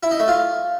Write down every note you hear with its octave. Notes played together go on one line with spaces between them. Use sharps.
E4
D#4
A3
F4